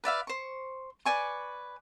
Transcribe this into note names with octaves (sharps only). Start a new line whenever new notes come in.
B4 D5 E5 F5
C5 C#6
B4 D5 G#5 C#6